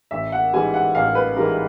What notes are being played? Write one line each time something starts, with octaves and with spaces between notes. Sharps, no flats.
A1 E5
F#5
G#2 E3 G3 G#5
F#5
A1 F5
B4
G#2 E3 G3 A#4